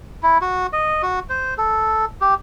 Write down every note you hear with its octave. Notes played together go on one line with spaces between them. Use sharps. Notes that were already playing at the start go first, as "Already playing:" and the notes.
E4
F#4
D#5
F#4
C5
A4
G4